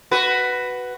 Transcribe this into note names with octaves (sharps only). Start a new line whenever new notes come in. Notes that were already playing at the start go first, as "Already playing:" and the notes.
F#4 B4